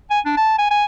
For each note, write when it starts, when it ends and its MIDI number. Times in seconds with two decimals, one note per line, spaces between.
0.10 0.20 80
0.25 0.35 62
0.37 0.54 81
0.58 0.70 80
0.71 0.85 80